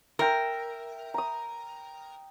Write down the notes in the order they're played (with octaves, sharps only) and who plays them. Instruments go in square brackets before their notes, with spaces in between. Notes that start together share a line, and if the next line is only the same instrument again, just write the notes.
[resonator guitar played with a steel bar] A#4 [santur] E5 G5
[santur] A#5 D#6